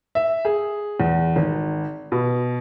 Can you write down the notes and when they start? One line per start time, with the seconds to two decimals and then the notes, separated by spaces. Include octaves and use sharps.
0.15 E5
0.45 G#4
1.00 E2
1.36 G#1
2.12 B2